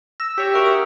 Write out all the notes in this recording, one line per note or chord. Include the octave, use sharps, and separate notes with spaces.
E6 A#6
G4 C#5 B6
D4 F#4 A#4 E5 C#6
D#6